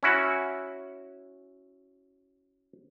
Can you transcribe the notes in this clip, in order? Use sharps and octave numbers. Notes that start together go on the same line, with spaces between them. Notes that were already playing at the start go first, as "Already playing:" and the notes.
C#4 E4 F#4